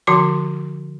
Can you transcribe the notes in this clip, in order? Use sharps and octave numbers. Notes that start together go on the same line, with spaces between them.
D3 F3 F#4 C6 D6